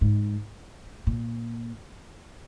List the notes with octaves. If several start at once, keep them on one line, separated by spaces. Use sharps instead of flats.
G#2
A#2